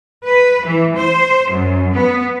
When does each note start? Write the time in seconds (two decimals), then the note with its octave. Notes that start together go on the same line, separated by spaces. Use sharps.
0.25 B4
0.65 E3
0.95 C5
1.49 F#2
1.93 B3